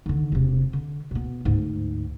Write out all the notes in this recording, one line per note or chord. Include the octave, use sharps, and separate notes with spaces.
D3 D#3
E1 C3
D3
B2 B3
D2 G#2